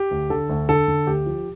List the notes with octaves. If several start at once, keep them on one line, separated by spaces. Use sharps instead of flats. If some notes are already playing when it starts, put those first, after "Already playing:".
Already playing: G4
D2
D3 A4
D2
D3 A4
D3
D2 G4
F3